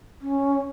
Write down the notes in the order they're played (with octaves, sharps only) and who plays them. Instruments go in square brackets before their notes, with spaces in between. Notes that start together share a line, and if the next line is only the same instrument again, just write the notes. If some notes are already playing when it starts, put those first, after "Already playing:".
[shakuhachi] C#4